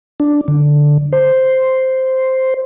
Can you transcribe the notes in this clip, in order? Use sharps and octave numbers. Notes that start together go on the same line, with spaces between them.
D4
D3
C5